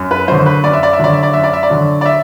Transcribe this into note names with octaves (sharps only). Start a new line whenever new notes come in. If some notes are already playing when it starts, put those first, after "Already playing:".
Already playing: F#2
B4
D3 F#3 C5
B4
F#2 D5
E5
D5
E5
D3 F#3 D5
E5
D5
F#2 E5
D5
E5
D5
D3 F#3
D5
E5